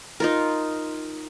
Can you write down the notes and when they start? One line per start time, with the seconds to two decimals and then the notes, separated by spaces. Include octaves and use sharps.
0.20 D#4 F4 A#4